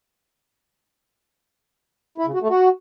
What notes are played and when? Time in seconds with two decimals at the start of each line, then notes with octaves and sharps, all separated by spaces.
2.18 E4
2.26 C#3
2.34 F#4
2.42 A3
2.50 F#4